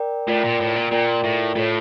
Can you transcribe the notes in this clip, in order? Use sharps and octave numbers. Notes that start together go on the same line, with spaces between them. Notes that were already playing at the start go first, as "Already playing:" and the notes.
Already playing: A#4 D5 G5
A2 F4 A#4 D5 G5
A#2
A2
A#2
A#2 F4 A#4 D5 G5
A2
A2 F4 A4 C#5